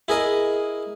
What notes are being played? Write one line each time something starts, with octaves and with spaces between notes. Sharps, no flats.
E4 G#4 A#4 D#5